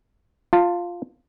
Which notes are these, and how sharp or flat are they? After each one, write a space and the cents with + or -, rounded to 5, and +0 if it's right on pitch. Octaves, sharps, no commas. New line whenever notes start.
F4 +0 A5 +25